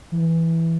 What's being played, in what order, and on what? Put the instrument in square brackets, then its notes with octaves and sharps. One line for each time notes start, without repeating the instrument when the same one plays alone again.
[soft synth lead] E3